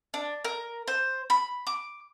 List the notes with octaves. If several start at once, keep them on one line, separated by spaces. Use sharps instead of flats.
D4
A#4
C5
B5
D6